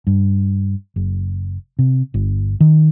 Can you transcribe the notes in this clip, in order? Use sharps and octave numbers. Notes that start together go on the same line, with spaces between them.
G2
F#1
C3
G1
D#3